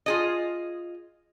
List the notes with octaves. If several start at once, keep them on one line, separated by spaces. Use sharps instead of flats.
F4 G#4 D#5